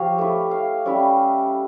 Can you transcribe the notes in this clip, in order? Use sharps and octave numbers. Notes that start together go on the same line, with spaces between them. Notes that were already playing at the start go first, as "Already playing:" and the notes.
Already playing: F3 G4 C#5 F5
A3 E4
F5
G3 C#4 E4